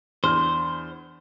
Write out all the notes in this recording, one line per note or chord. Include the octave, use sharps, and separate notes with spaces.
E2 D4 C5 F6